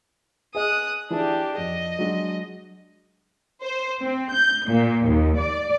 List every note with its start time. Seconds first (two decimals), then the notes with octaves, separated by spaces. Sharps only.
0.55 G#4 D#5 D#6 F#6
1.10 E3 D4 E4 G4 G#4
1.58 F2 D#5
1.99 F#3 G#3 D4
3.62 C5
4.04 C4
4.34 G6
4.70 A#2
5.08 D#2
5.40 D5